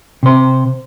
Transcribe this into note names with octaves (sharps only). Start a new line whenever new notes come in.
C3 C5